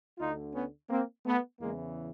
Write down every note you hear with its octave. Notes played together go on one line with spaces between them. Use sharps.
D2 D3 D#4 F4
B3 C#4
A#3 C4
A3 B3
E2 C#3 E3 G#3 A#3